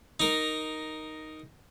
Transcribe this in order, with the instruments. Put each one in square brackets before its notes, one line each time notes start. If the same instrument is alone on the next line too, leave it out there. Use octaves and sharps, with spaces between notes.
[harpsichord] D#4 A#4